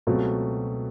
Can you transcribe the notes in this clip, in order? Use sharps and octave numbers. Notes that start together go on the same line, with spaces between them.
C#2 B2 F#3 A3 C4